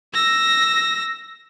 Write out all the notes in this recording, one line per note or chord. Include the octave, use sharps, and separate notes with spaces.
E6 A#6